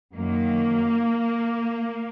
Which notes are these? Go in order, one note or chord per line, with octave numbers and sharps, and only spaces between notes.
F#2 D#3 F#3 A#3